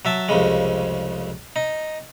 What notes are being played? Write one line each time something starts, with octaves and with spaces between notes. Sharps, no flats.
F#3 E5 A5
C2 F2 C#3 G#3
D#4